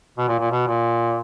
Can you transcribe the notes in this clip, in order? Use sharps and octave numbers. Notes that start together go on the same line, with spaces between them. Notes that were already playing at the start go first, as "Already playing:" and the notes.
B2
A#2
A#2
B2
A#2